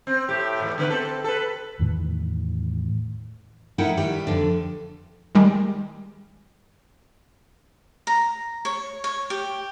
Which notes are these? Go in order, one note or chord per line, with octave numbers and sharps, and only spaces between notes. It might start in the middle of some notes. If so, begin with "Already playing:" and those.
C4
A2 G4
E2 G#2
D3 B3 B4
C4 A4
A4 B4
E2 A2 D#3 E3
D#4 E4 A#4 B4 F#5 G5
D#3 G3 G4 B4
F2 D3
D#3 G3 G#3
A#5
C#5
C#5
G4